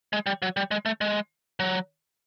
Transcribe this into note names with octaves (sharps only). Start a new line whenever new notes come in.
G#3
G3
F#3
G3
G#3
A3
G#3
F#3